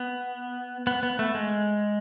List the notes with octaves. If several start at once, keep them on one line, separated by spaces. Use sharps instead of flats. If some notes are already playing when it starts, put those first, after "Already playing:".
Already playing: B3
B3
B3
A3
G#3